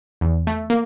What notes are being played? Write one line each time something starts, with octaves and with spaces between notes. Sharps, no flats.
E2
A3
A#3